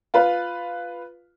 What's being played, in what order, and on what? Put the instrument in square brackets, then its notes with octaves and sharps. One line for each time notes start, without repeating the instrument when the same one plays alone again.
[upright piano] F4 B4 F5